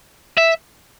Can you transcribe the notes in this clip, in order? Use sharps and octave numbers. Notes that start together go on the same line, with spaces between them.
E5